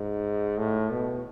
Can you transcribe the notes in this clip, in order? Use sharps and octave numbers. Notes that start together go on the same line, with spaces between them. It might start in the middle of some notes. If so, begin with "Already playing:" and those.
Already playing: G#2
A2
B2